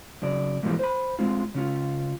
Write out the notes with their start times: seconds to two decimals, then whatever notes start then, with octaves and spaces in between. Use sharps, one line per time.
0.22 F#2 C#3 D5
0.63 G#2 B2 E3 F3 G3 A#3
0.79 C5 B5
1.19 G#3 C4 F4
1.54 C#3 C#4 F4